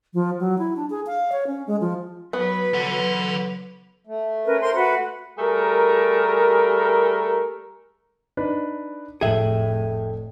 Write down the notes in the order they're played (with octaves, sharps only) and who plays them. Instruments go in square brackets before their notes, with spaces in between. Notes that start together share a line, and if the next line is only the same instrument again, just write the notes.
[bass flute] F3
F#3
E4
D4
G#4
F5
C#5
C#4
G#3
F3
[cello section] F#3 B4 [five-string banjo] B3
[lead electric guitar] A4 F#5
[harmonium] A3
[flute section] C#4 A#4 B4
A#4 C5 C6
F#4 B4 F#5
[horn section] G3 A3 G#4 A#4
[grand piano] D4 D#4 B4
[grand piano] F1 [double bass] A2 [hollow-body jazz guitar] G#4 E5 [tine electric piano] A4 G5